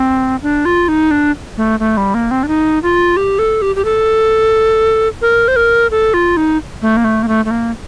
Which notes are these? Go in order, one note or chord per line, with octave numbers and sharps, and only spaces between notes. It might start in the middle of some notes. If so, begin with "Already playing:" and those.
Already playing: C4
D4
F4
D#4
D4
A3
A3
G3
A#3
C4
D4
D#4
F4
G4
A4
G4
G4
A4
A#4
C5
A#4
A4
F4
D#4
A3
A#3
A3
A#3
A3
A3
A#3